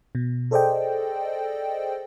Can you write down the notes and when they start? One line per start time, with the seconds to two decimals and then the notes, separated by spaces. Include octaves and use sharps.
0.15 B2
0.51 G#4 A4 C5 D5 D#5 G5